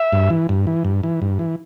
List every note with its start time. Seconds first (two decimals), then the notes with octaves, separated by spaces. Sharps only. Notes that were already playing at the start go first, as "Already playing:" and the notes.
Already playing: E5
0.13 G2
0.30 E3
0.49 G2
0.67 E3
0.85 G2
1.03 E3
1.22 G2
1.39 E3